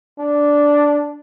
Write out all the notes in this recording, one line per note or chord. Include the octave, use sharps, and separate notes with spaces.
D4